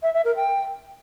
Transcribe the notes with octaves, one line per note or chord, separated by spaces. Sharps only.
E5
E5
A#4
G5